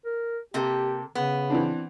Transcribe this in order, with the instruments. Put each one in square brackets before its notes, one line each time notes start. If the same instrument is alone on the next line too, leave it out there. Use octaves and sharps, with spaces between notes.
[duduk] A#4
[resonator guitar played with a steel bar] C3 A#3 A4 [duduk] G4
[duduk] C#3 [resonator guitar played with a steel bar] B3
[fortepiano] E3 C4 D4